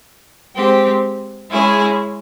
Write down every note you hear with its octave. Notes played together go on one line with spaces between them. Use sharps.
G#3 C4 G4
G#3 C#4 E4 G#4